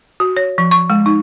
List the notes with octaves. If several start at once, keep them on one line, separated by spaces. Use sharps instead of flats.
F#4
C#5
F3
C#6
G#3
D#4